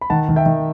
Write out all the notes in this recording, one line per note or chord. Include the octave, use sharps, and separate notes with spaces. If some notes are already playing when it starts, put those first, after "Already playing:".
B5
D#3 F#5 A5
D#3
E5 G5
D#3